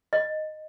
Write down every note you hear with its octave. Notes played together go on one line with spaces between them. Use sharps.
D#5